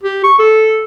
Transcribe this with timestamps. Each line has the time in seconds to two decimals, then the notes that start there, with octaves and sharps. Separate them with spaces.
0.03 G4
0.24 C#6
0.39 A4